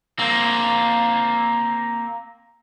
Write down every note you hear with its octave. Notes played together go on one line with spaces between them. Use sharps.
A#3 C4